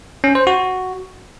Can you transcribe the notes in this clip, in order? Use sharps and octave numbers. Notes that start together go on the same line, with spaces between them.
C#4
C5
F#4